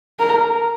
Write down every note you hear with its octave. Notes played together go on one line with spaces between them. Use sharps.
A#4